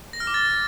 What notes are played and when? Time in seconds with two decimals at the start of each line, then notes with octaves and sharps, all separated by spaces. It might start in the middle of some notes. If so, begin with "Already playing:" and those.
0.13 A#6
0.20 F6
0.27 D6
0.34 A6